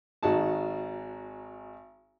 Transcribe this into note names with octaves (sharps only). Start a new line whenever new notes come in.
G#1 D#4 F#4 G#4 A5